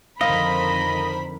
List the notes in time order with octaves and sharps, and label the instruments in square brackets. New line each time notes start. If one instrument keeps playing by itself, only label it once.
[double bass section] F2 D3 D#3 [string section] A#4 C5 B5 [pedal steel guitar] D#5 [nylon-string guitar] F5